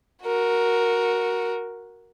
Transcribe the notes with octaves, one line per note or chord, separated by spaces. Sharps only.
F#4 A#4